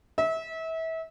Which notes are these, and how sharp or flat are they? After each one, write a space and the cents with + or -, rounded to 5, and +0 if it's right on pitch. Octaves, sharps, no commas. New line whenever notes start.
E5 -30